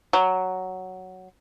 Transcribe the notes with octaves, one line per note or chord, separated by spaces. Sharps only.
F#3